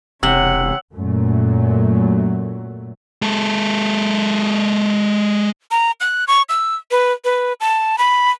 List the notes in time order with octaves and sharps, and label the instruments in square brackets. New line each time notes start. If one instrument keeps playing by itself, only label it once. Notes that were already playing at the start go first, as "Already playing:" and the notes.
[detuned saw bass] E1 [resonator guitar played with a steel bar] C3 [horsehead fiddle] C#5 F#5 [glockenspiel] E6 F#7
[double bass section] F#2 A#2 F#3 A3
[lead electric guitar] G#3 A4
[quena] A#5
F#6
C#6
E6
B4
B4
A5
B5